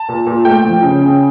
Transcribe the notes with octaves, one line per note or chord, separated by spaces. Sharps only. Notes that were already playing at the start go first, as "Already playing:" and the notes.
Already playing: A5
A#2
A#2
A3 G5
F3
C#3
C#3